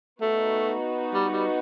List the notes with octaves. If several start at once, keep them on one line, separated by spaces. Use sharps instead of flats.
A3 B3 D#4 F#4
G3
G3